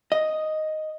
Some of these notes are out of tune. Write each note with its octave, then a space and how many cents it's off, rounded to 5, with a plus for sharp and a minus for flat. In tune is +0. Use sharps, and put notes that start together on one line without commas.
D#5 +0